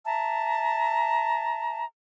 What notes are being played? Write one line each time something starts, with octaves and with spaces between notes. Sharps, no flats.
E5 A5 A#5